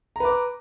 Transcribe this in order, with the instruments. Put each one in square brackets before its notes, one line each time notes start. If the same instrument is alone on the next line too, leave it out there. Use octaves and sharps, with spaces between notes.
[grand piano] A#5
B4
D6